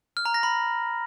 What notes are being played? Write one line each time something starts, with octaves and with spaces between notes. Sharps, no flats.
F6
A#5
A#6
B5